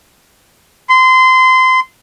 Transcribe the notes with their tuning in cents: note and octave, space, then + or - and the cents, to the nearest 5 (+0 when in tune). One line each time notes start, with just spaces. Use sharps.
C6 -25